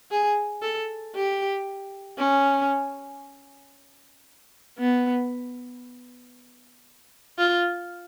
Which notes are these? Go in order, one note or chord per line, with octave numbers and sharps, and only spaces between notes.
G#4
A4
G4
C#4
B3
F4